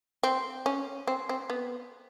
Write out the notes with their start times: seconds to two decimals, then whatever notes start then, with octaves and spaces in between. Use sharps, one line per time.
0.23 C4
0.66 C#4
1.07 C4
1.29 C4
1.50 B3